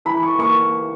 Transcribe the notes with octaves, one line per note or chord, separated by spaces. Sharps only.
E3 B5
C#6
A#3 C#6